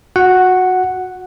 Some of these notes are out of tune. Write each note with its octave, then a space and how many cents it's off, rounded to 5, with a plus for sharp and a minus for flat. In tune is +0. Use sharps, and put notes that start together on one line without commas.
F#4 -20 F#5 +0